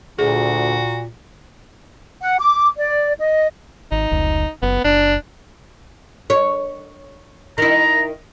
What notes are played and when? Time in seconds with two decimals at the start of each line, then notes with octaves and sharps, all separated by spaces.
0.19 D2 A#2 F#4 G#4
2.22 F#5
2.40 D6
2.77 D5
3.19 D#5
3.92 G#1 D#4
4.11 F1 C#2
4.62 F#1 B3
4.84 F#1 D4
6.30 C#5
7.58 D#3 E4 A#5